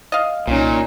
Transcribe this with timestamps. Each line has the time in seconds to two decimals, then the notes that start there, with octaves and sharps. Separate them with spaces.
0.12 D#5 F5
0.47 C2 A#2 C#4 D#4